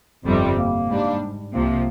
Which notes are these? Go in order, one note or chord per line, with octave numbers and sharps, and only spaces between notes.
G1 F2 C3 G3 C4
A#3
G#2 G3 D4
C2 C3 F3 A#3